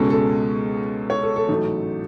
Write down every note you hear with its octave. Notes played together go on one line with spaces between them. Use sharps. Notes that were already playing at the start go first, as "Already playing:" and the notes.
Already playing: C#2 B2 G#3 C#4 A4
A4
C#5
A4
A4
A1 G#2 F#3 A3